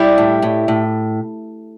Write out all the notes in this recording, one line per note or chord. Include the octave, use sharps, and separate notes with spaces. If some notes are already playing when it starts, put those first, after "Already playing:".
Already playing: G3 E4 G4
A2
A2
A2